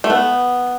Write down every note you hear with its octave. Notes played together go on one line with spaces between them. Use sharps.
A3
B3